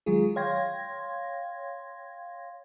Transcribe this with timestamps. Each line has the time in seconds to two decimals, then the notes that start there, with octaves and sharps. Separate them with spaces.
0.06 D#3 F#3 G#3 F4 G#4
0.36 C#5 F5 G5 C6 G#6 A#6